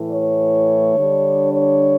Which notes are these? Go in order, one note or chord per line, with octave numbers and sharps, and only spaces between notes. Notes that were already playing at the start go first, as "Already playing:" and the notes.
Already playing: A2 E3 A3
C#5
D3 G3 D4
C#5